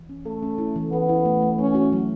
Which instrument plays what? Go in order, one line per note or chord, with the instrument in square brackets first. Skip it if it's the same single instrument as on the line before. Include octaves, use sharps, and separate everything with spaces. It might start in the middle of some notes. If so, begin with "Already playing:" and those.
Already playing: [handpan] E3
C#4
[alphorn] A3 [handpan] A4
[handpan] C#4
E4
E3
[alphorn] B3 [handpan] A4
[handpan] E4
A3
A3
[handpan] A3 [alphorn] C#4
[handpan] F#4
F#3